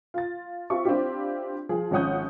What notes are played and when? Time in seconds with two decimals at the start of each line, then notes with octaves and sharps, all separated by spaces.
0.14 F4 A6
0.70 C4 F4 G4 E5 C#6
0.85 C4 D4 E4 F4 G4
1.69 F3 G#4
1.91 G#1 F3 C#4 F#5 D#6 G6